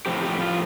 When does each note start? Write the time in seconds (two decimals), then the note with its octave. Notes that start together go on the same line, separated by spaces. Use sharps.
0.06 A2 F3 C4 G4
0.23 G4
0.40 F4